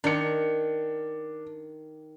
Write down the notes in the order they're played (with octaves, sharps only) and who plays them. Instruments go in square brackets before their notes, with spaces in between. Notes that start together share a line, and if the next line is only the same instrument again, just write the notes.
[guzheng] D#3 [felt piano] D4 C#7